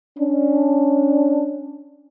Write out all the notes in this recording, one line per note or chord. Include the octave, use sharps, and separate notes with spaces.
C#4 D4